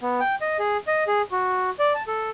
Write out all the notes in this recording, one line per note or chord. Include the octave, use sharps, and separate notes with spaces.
B3
G5
D#5
G#4
D#5
G#4
F#4
D5
A5
A4